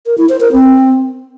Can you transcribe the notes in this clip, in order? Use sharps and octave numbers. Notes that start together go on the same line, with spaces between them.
A#4
E4
C5
A#4
C4